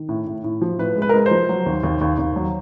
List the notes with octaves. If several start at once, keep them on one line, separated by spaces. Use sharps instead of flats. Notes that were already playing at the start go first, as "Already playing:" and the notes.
Already playing: D#3
A2
A2
A2
F3
A2 B4
G#3
B4
A#4
G#3 B4
C5
F3
F#3
D#2
D#2
D#2
D#2
F#3